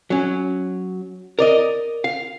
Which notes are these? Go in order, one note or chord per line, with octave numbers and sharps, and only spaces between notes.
F#3 C#4
A#4 D5 D#5
F5